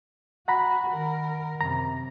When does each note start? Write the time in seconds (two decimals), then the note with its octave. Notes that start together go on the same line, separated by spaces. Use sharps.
0.48 F#4 F#5 A#5 B5
0.90 D#3 A#4
1.61 F#2 C3 A#5